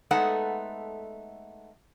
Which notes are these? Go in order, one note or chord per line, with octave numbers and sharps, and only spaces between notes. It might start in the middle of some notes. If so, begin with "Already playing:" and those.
G#3 A3 B3 D#4 A4 F#5